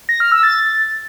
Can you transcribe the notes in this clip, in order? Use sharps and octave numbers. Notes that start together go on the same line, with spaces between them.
A#6
F6
E6
A6